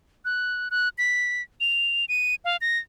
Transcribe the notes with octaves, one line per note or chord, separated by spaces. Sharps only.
F#6
F#6
B6
F7
D#7
F5
A#6